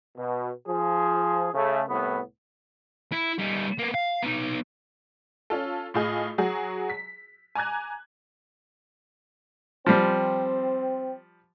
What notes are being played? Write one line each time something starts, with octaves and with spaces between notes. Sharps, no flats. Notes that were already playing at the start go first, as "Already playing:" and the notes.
B2
F3 G#4
C#3 A3
C2 A2 B3
E4
G3 D#4
A#3 B3
F5
B3 D#4
C#4 F4 A4
A2 F4 G#4 D#5
F#3 F#4 G#4
B6
G#5 A#5 D6 F#6 G#6
F3 G3 C4